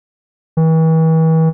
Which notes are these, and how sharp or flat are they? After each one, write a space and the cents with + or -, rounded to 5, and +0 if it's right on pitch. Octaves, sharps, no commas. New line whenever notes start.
E3 -40